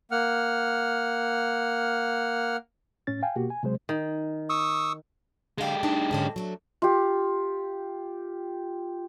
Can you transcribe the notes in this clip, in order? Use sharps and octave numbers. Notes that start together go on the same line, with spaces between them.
A#3 F#5 F6
A2 C#4 A6
F5 G5 G#5
B2 A#3 F#4 G4
G#5
C3 F#3 G#3 C5
D#3
C#6 D#6 E6
D3 G#3 G4 F5
D4 D#4 E5
G#2 D3 C#4
F#3 A3 D4
F4 G4